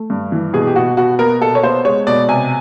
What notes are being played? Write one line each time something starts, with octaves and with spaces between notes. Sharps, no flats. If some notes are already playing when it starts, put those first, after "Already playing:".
Already playing: A3
G2
E3
B2 G#4
G4
B2 F#4
B2 F#4
B3 A#4
B2 A4
C#5
B3 C5
G#3 C#5
B2 D5
C3 G#5